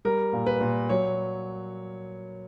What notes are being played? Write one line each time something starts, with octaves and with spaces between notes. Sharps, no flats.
G3 A#4
A#2
B4
A#2
F#3 C#5